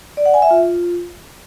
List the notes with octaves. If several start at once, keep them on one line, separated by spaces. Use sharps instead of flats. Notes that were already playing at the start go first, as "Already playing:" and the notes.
D5
F#5
G#5
E5
F4